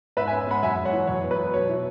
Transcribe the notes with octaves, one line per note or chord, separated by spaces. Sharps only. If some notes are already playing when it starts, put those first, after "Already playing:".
G#2 B4 E5
E5 G#5
C#4
G#3 F#5 B5
F#2 E5 G#5
G#3
C#5 F#5
E3
F#2 C#5
B3
B4
F#3
B2 C#5
E4